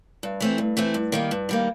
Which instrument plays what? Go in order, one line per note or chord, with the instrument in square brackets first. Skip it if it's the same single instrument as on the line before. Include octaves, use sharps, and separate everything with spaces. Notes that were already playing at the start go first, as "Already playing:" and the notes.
[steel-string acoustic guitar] G2
E3 A3 C4
G2
E3 A3 C4
G2
D#3 G3 A#3
G2
D#3 G3 A#3